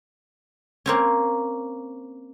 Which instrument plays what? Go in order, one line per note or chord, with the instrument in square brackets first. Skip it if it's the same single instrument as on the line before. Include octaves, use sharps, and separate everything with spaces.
[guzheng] A#3 C4 C#4